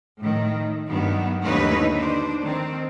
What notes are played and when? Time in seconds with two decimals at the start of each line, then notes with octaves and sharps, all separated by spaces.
0.20 A2 D#3
0.86 G2 D#3 F#3 B3
1.42 D#2 D3 A3 D#4 B4 C#5
1.94 D4 C5
2.42 D#3 C4